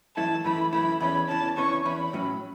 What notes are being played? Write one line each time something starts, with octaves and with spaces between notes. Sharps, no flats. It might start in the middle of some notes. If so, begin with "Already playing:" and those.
F#2 E3 A3 E4 A5
F#2 E3 A3 E4 B5
F#2 E3 A3 E4 B5
E2 E3 C#4 B5
E2 E3 C#4 A5
E2 E3 C#4 C#6
E2 E3 C#4 B5
A2 F#3 C#4